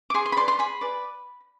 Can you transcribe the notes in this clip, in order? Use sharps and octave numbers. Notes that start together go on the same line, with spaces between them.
D6
G#4 C6
C6
B5
B4 D5 C6
C6
G#4 B5
B4 D5